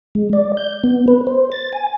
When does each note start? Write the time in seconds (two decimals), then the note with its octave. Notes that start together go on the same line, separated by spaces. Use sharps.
0.15 G#3
0.33 D5
0.57 G6
0.84 B3
1.08 B4
1.27 C5
1.52 A6
1.73 G#5